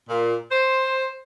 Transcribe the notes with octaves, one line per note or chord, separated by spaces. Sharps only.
A#2
C5